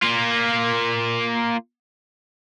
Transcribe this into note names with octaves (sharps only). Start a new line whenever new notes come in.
A#3 F4